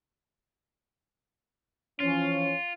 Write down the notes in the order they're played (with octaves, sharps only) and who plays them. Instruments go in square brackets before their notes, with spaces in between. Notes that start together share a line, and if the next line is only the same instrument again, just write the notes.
[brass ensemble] E3 F3 C#4 [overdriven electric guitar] F4